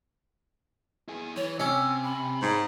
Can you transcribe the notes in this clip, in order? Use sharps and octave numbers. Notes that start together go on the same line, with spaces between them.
E4 G#4
E3 C#5
C3 C#4 E6
B5
G#2